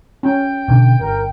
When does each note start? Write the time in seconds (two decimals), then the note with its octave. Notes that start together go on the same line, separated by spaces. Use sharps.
0.23 C#4 G5
0.68 B2 D3
1.01 G1 A#4